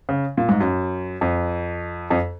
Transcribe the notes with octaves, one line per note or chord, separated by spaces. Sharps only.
C#3
A#2
G#2
F#2
F2
F2